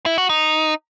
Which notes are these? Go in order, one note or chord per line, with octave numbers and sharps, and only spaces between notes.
E4
F#4
D#4